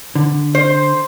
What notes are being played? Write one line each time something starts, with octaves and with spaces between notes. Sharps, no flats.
D3
C5